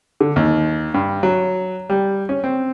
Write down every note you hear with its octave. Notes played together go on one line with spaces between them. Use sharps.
D3
D#2
G2
F#3
G3
C#4
C4